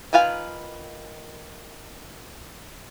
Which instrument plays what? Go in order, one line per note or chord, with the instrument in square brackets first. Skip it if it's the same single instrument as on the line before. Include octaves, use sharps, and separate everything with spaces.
[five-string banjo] D#3 F4 B4 F5 G#5